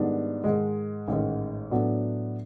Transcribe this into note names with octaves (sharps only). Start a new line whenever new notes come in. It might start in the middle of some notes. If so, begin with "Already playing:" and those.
Already playing: G#2 D#3 G3 B3 D4
G#2 D#3 G#3
A1 G#2 D#3
A2 F#3 B3 D4